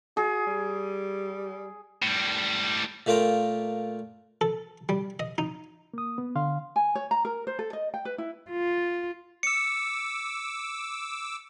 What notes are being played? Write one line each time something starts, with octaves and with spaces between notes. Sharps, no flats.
F#4 G#4
G3
A2 G3
A#2 A3 A#3 F4 G5 A#5
A4
G3
D#5
D#4
A#3 D#6
B3
D3 F5 C6
G#5
C#5
A#5
A#4
C5
A4
D#5
G5
B4
E4
F4
D6 E6 C#7